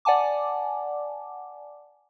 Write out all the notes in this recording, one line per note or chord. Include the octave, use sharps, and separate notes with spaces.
D5 F#5 G#5 A5 D6